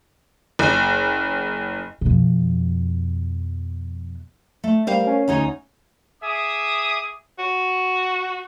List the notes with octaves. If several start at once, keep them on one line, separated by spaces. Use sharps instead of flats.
F#1
F2 B2
A3
G3 A#4 C5 F5
C#4
D2 D#4 C#5
G#4 E5 D6 D#6
F#4